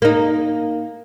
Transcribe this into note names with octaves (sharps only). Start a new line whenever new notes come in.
A#3 D#4